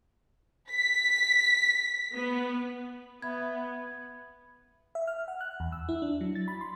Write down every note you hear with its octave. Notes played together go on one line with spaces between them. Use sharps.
B6
B3
B3 E5 B5 G#6
E5
F6
F#5
F#6
E2
E6
E4
D4
F#3
A6
B5
C6